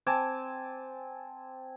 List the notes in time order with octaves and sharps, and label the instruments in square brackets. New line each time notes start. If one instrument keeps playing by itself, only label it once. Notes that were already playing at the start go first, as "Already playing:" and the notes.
[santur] C4 G#5 A5 D6